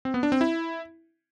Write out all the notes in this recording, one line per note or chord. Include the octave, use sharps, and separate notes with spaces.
C4
B3
D4
C4
E4